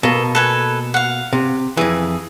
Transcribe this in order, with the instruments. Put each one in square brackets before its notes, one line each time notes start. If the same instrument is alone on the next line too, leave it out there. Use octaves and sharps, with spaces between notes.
[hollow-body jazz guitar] B2 A#3 [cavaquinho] A4
[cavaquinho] A4 B4 G#5
F5 F#5
[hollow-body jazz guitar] C3
[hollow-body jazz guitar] F2 E3 [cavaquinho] G#4